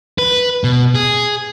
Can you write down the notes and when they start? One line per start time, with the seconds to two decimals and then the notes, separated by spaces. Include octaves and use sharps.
0.18 B4
0.64 B2
0.95 G#4